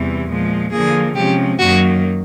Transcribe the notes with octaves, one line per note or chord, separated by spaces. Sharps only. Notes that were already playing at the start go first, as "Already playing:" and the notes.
Already playing: E2 C3 E3 G3
A#2 F3 G#3
D3 F3 A#3 G#4
C3 F3 G#3 C#4 G4
F#2 D#3 F#3 A#3 F#4